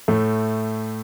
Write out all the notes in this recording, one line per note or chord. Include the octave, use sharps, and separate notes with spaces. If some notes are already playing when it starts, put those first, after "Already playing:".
A2 A3